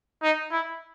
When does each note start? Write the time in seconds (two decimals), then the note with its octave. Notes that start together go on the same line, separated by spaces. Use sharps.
0.23 D#4
0.52 E4